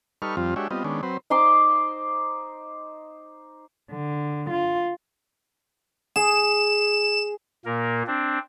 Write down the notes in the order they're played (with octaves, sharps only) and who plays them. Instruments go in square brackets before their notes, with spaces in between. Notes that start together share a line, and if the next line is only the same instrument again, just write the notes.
[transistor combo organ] G3 D#4 A4 B4 C#6 F6
F2 F3 G3 C4 F4
G#3 D4 F#4 G4 C#5 E5
G3 B3 C4 F4 D#5
D#3 G#3 B3 C#4 D4
F#3 C4 B4 C5
[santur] D#4 C5 C6 D6
[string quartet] D3
F4
[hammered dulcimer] G#4 [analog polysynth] E7
[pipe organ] A#2 A#3 A#4
C4 D4